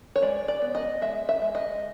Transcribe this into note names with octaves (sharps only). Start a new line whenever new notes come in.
C#5
G#3 D5
D5
B3
D#5
G#3 E5
E5
G#3
D#5